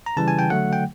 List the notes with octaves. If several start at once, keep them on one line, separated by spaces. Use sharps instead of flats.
A#5
C#3 E3 G3 A5
G#5
G5
D3 F#3 A3 F#5
G5